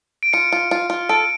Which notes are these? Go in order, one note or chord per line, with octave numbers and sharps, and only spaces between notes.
D7
F4 C#7
F4
F4
F4
A4 D7